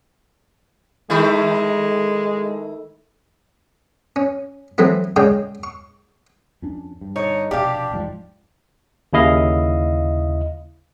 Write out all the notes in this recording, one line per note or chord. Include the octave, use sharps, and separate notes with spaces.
D#3 G#3 A3 E4
C#4
E3 F#3 A3 C4 E4
C#3 G#3 C#5 D5 G5
C#6
F2 C#4 D4
G2
D3 D#4 C#5
F1 B2 D4 G4 F5
E1 G#2 F3
D#2 C#3 E4 D#5 F5